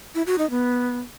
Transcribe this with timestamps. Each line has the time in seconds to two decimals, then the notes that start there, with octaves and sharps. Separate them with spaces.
0.15 E4
0.27 F#4
0.38 D#4
0.50 B3